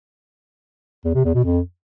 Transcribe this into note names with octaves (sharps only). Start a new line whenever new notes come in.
E2
C3
E2
B2
F2